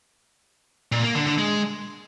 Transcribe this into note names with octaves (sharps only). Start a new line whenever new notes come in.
A#2
A#3
D3
D3
G#3